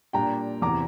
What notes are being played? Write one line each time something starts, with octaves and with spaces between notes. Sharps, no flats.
A#2 G3 D4 G5 A#5
E2 C3 E3 A#5 D6